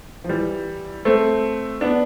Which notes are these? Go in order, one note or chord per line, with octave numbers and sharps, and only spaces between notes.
F3
E3 G3
A3 C4
B3 D4